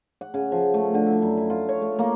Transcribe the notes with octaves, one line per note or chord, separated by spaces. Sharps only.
F#5
C#3
F3
A3
D3
E4
F#2
E4
F4
C#5
A3
A#3